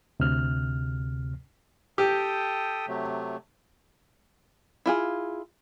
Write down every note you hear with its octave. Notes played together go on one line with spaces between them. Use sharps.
D2 C3 F6
G4 A4 G5 D#6
C3 F#3 A3
E4 F4 G#4